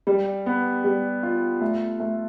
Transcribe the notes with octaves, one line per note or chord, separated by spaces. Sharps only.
G3
B3
G3
F4
A3
A3